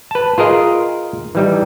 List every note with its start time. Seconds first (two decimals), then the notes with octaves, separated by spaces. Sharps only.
0.11 B4 A5
0.38 F4 G#4 A#4 D#5
1.35 E3 G3 D#4